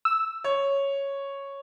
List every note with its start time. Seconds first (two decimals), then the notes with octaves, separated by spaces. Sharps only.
0.05 E6
0.44 C#5